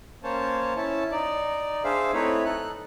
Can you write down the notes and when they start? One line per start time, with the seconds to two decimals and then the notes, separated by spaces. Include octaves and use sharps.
0.23 A#3 C#4 C5 C#5 A5
0.76 C#4 E4 A5
1.12 D#4 D5
1.84 D4 G#4 C5 E5 F5
2.13 A3 C4 D#4 E4 B4 C#5
2.45 D#4 A4 F#6